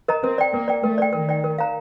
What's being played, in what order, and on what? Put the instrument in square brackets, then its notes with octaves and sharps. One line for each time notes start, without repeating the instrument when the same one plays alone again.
[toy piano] A#4 D#5 A#5
[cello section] C4 [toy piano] A#4
[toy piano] D5 G5
[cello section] A#3 [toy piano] A#4
[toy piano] D5 G5
[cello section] A3 [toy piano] A#4
[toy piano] D5 G5
[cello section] D#3 [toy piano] A#4
[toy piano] D5 G5
A#4
F5 A#5